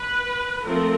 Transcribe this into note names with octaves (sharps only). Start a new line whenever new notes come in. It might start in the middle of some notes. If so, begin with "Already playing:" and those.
Already playing: B4
F3 A3 C4 A#4